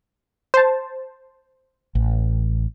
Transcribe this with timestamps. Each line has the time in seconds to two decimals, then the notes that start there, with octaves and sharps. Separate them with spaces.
0.54 C5 A5
1.95 A1